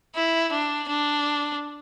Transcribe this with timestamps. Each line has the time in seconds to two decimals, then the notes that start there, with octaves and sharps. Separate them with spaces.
0.16 E4
0.52 D4
0.88 D4